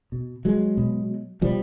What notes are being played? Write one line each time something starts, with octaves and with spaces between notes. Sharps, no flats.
B2
F#3 G#3
B2
B2 F3 G3